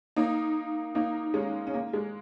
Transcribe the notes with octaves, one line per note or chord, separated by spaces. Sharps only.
A#3 D#4
A#3 D#4
G#3 C#4
C#4
A#3
G#3